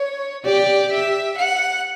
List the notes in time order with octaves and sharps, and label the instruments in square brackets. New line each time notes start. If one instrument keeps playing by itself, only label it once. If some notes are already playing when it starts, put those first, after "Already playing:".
Already playing: [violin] C#5
[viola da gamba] G4 [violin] D5
[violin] E5
F#5